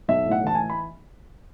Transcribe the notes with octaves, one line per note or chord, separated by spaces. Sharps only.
B1 E5
A2
F#5
E3 A5
G#5
B5